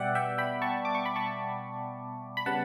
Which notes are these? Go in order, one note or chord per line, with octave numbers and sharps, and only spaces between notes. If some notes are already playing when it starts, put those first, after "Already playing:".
Already playing: B2 G3 B3 D5 E5 F#5 G5
E5 G5
G5 B5
A5 C#6
D6
C#6
B5
A5 C#6
B5
C#3 G3 B3 F#5 A5